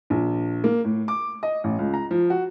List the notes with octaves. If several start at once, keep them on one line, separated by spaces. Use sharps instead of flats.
A#1
A#3
A2
D6
D#5
A1
C#2
A#5
F3
F#4